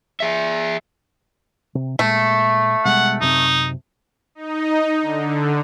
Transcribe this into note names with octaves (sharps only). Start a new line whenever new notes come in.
G#4 E5
C3
A#2 G#3 A3
B2 G3 G#3 F#5
F#2 C3 C4 D#4
D#4
D3